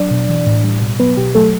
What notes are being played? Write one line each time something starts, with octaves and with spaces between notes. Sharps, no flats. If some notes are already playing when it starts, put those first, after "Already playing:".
Already playing: F#3 D4 D5
B2
E3
A2
G3
B2
F#3 B3 B4
B2 G4
F#3 A3 A4